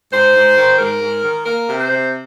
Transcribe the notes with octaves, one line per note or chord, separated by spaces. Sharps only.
G#2 C5
G#2
D#3
G#2 A#4
G#2
D#3
A#3 A#4
C3
C5
C3